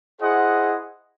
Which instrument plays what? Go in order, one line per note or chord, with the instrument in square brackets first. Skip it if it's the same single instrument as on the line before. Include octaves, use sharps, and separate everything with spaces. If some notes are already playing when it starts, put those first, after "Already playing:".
[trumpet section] E4 G#4 C5 D#5 F#5